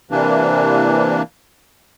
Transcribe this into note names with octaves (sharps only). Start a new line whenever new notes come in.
C3 E3 A#3 D4